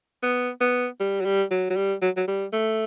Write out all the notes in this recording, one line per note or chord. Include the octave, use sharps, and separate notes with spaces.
B3
B3
G3
F#3
G3
F#3
F#3
G3
F#3
F#3
G3
A3